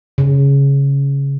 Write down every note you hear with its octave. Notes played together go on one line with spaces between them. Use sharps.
C#3